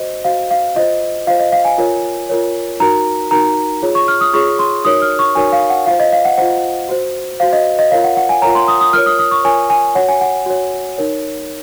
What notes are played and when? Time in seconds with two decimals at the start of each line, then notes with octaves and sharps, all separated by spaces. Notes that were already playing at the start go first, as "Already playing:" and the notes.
Already playing: F#4 C5 D#5
0.24 F#4 C5 F5
0.51 F5
0.76 F4 C5 D#5
1.27 F4 F5
1.30 C5
1.40 D#5
1.52 F5
1.65 G#5
1.78 F4 A#4 C#5
2.29 F4 A#4 C#5
2.80 D#4 F#4 A#4 A#5
3.31 D#4 F#4 A#4 A#5
3.82 F4 G#4 C#5
3.95 C#6
4.08 F6
4.21 D#6
4.33 F4 G#4 C#5 C#6
4.59 C6
4.85 D#4 F#4 A#4 C#5 D#6
5.02 F6
5.19 C#6
5.35 D#4 F#4 A#4 C#5 G#5
5.52 F5
5.70 F#5
5.86 F4 F5
5.91 C5
6.00 D#5
6.12 F5
6.25 F#5
6.38 F4 C5 F#5
6.89 F#4 C5
7.40 F#4 C5 F5
7.53 D#5
7.79 D#5
7.91 F4 A#4 C#5 F5
8.04 F#5
8.17 F#5
8.29 G#5
8.42 F4 A#4 C#5 A#5
8.55 C6
8.68 D#6
8.81 D#6
8.93 F4 A#4 C#5 F6
9.06 D#6
9.19 D#6
9.31 C#6
9.44 F4 A#4 C#5 G#5
9.70 G#5
9.95 F#4 C#5 F#5
10.08 G#5
10.21 F#5
10.46 F#4 C#5
10.98 D#4 A#4 C#5